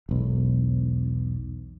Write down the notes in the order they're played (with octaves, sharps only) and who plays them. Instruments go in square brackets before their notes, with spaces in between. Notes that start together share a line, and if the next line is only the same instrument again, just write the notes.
[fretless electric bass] E1 B1